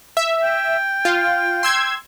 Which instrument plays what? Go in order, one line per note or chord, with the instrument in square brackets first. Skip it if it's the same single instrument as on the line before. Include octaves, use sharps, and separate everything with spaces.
[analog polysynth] E5
[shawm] G5
[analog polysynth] F4
C6 E6 G#6